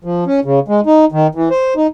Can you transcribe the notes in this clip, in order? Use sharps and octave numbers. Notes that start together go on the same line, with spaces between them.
F3
C#4
C#3
G#3
D#4
D#3
E3
C5
D#4